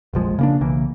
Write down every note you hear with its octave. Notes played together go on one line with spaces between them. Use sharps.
F1 A#1 F3 G#3
C#3 A#3 D4
B1 C#3 E3 A#3